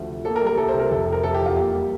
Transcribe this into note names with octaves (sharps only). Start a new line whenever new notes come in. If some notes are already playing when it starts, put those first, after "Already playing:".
Already playing: D2 F3 A3
C3
A#3 A4
A#4
G3
A#4
C2 A4
C5
C3
A#4
F1 A4
C3
A#4
F1 A4
G4
E2
F4
A#3 G4
G3